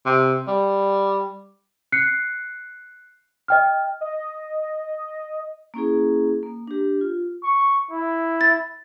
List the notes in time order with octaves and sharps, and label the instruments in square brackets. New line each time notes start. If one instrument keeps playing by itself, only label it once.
[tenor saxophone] C3
G3
[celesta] F#6 C7 C#7
D#5 G5 F6
[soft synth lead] D#5
[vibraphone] A#3 C#4 E4 G#4
A#3
D4 G4
F4
[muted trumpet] C#6
E4
[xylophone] A6